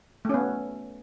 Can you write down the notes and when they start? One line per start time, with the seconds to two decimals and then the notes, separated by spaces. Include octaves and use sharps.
0.25 A3
0.29 C#4
0.34 B3